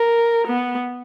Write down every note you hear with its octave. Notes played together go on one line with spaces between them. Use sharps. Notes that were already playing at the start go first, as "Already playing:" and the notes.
Already playing: A#4
B3